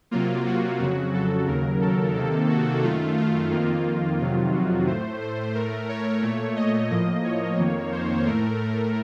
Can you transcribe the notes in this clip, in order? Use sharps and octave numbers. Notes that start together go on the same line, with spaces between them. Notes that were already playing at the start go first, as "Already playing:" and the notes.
C3 F#3 A#3 F4
F#4
F2 C#3 F#3 F#4
A4
D#2 C#3 F#3 A#4
A4
C3 D#3 A#3 A4
F#4
F#2 D#3 A3 F4
F4
F2 D#3 A#3
F2 C3 D#3 F#3 F4
F#4
A2 A3 C5
C5
A2 A3 A#4
C#5
A#2 A3
D#5
A2 F3 A#3 D#5
C#5
F2 D#3 A#3
C5
A2 A3 A#4